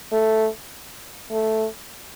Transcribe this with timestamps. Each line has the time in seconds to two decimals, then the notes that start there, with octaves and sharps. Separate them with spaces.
0.12 A3
1.30 A3